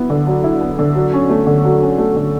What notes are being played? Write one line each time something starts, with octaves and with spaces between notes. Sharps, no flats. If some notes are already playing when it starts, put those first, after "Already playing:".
Already playing: F#3 B3 E4
D3
F#3
E4
B3
D3
F#3
C#4
A3
D3
F#3
C#4
A3
D3